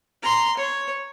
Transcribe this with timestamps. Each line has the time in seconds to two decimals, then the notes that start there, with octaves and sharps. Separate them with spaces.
0.23 A#5 C6
0.57 C#5